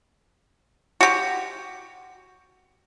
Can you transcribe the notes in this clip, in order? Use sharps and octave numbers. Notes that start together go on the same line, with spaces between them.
F#4 G4